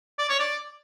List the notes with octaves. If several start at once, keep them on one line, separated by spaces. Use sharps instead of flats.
D5
C#5
D5